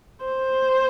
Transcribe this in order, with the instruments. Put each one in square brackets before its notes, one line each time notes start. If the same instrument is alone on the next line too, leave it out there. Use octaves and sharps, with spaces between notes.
[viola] C5